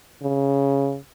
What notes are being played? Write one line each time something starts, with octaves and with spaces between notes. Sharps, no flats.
C#3